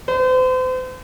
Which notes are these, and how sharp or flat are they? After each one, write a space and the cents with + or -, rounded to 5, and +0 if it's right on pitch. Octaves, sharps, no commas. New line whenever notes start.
C5 -40